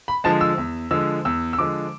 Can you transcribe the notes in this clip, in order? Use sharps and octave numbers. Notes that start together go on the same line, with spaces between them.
B5
D3 F3 G#3 A5
E6
E2
D3 F3 G#3 E6
E2 E6
E6
D3 F3 G#3 D6